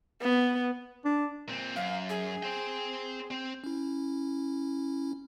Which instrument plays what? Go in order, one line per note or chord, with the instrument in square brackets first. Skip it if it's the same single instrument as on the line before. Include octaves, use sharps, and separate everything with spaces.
[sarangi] B3
[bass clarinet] D4
[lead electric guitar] A#2 C4
[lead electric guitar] F#2 [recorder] F5
[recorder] G#4
[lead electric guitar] C5 G5
C4
[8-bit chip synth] C#4 E4